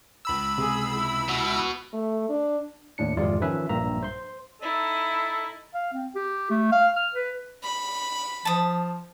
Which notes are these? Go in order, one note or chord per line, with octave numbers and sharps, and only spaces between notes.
C#2 B5 E6
C3 G#4
E4
B2
A3
D4
D#2 A2 D4 C#7
G#1 F2 C3 G#3 F4 D5
D#3 F3 C#4 B4 E5
A#1 G2 A#3 E5 A#5
C5 C6
D#4 E4 A4
F5
C4
G4
A3
F5
F6
B4
B5
F3 A5 D#6